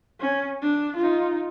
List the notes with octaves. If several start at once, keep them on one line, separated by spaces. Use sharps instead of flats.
C#4
D4
D#4 F4